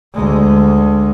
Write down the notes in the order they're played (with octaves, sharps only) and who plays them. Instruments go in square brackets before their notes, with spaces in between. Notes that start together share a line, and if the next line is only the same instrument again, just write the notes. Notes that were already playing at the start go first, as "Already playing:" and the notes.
[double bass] D2 G#3